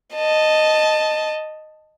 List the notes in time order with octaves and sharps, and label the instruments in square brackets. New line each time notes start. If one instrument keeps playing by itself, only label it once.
[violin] D#5 A5